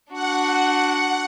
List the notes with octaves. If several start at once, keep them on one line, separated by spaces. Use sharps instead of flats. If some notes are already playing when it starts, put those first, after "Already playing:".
D4 F#4 F#5